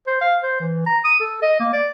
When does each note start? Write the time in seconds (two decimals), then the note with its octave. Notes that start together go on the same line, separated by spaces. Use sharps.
0.07 C5
0.21 F5
0.43 C5
0.60 E3
0.86 A#5
1.04 D#6
1.20 A4
1.42 D#5
1.60 A#3
1.73 D5